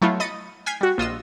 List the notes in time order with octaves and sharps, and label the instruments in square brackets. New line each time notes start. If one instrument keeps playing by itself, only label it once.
[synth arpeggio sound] F#3 A3 B3 E4 F4
D#5 B5 D#6 A6 C#7
G5 G#5 F6 G#6 B6 C7
G3 F#4
A#1 F4 D#5 E6